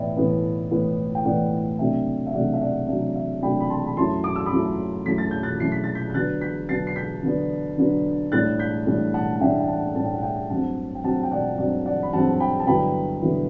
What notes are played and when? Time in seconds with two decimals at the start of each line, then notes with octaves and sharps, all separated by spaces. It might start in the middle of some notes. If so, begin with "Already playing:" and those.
Already playing: A2 E3 B3 D5 E5 G5
0.16 A2 E3 B3
0.71 A2 E3 B3
1.15 G5
1.25 A2 E3 B3 D5 F#5
1.79 C3 F#3 A3 D4 E5 G5
2.27 E5
2.34 C3 F#3 A3 D4 D5 F#5
2.54 E5
2.61 D5 F#5
2.88 C3 F#3 A3 D4 E5
3.15 E5
3.42 C3 F#3 A3 D4 G5 B5
3.60 B5
3.69 A5 C6
3.87 B5
3.97 F#2 F#3 A3 E4 A5 C6
4.24 D6
4.36 E6
4.46 B5 D6
4.51 F#2 F#3 A3 E4
5.06 F#2 F#3 A3 E4 B6
5.18 A6
5.31 G6
5.43 F#6 A6
5.60 F#2 F#3 A3 E4 C7
5.72 B6
5.84 A6
5.95 G6 B6
6.10 G6
6.14 D3 F#3 B3 D4 F#6 A6
6.41 G6 B6
6.69 D3 F#3 B3 D4 A6 C7
6.87 C7
6.96 G6 B6
7.23 D3 F#3 B3 D4
7.78 D3 F#3 B3 D4
8.32 A2 G3 D4 F#6 A6
8.59 G6 B6
8.87 A2 G3 D4
9.14 F#5 A5
9.36 F#5
9.41 A2 G3 D4 E5 G5
9.60 G5
9.68 F#5 A5
9.95 A2 G3 D4 A5
10.05 G5
10.14 F#5
10.23 E5 G5
10.50 G2 F#3 C4 F#5 A5
10.95 G5
11.04 G2 F#3 C4 F#5 A5
11.23 G5
11.32 D5 F#5
11.58 G2 F#3 C4 D5 F#5
11.86 D5 F#5
12.03 B5
12.13 G2 F#3 C4 F#5 A5
12.40 G5 B5
12.60 A5
12.67 G2 D3 F#3 B3 E4 G5 B5
13.22 G2 D3 F#3 B3 E4